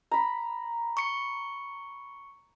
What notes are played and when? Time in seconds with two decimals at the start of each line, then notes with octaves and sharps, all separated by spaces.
0.11 A#5 B5
0.97 C#6 C#7